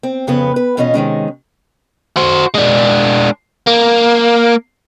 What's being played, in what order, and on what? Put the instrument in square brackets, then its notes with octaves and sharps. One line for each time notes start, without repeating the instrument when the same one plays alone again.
[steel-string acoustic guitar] C4
F2 C#3 B3 B4
B4
E2 B2 C#4 F4 D#5
C3 D#3 G#3 C#4
[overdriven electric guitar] F#4 C5
G#3 D4
A#3